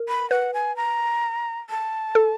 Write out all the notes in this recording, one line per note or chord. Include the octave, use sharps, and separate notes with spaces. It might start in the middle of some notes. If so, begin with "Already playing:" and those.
Already playing: A#4
B5
B4 F#5
G#5
A#5
A5
A4